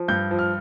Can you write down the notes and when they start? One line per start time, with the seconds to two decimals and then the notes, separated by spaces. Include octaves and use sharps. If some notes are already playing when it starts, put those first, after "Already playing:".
Already playing: F3
0.08 G2 G6
0.31 F3
0.39 F6